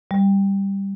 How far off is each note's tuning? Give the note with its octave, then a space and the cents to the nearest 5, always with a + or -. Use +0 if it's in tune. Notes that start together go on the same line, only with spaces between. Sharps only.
G3 +5